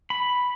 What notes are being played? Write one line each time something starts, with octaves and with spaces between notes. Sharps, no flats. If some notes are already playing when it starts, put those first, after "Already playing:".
B5